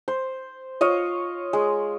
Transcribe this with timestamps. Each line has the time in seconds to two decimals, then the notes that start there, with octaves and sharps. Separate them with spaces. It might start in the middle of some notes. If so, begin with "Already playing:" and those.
0.08 C5
0.81 F4 C#5 D#5
1.53 G#3